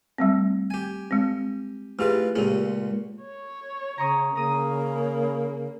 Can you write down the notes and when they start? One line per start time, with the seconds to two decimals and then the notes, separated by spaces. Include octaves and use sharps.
0.18 G3 A3 C4
0.70 G4 G#5
1.11 G#3 C4
1.99 E3 A3 F4 G4 G#4 B4
2.35 C#2 A#2 C#4 G4 G#4
3.22 C#5
3.98 C#3 A#5 C#6 D#6
4.35 C#3 A#3 A#5 D#6 D#7